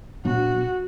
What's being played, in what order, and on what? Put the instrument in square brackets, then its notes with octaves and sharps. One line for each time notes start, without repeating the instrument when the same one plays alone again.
[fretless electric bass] A#2 F#3 B3 D4 [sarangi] F#4